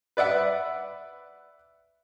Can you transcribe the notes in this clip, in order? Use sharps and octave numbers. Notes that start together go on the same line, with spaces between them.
B4 D5 E5 F#5